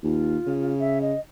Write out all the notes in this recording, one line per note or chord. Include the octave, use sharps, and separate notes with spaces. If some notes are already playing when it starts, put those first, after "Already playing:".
D#2 F4
C#3
E5
D#5